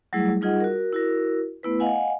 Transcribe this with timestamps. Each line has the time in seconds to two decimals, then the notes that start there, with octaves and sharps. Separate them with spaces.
0.13 F#3 G3 A3 E4 G#4
0.41 G3 D#4 F4 G#4 D#5 F#5
0.61 F#4 A#4
0.93 E4 F#4 A#4
1.63 A3 B3 E4 B4
1.80 D#5 F5 F#5 G#5